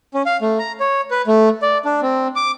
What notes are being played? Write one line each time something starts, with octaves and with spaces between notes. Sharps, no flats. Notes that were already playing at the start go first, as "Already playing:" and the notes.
C#4
F5
A3
A#5
C#5
B4
A3
D5
D4
C4
D6